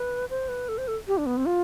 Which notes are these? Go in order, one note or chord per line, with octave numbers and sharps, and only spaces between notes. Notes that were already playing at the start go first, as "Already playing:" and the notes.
Already playing: B4
C5
B4
A4
C5
A4
G4
D4
B3
C4
F4